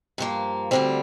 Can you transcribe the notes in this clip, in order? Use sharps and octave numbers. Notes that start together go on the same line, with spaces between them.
G2 F3 A#3
D2 D3 G3 C4